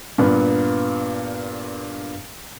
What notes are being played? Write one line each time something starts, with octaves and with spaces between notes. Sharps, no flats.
G2 A#2 B3